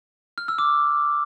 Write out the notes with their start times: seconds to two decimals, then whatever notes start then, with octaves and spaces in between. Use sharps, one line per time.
0.38 F6
0.48 E6
0.59 D6